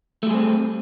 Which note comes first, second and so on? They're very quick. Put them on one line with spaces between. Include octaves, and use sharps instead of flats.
A3 G3 G#4 C4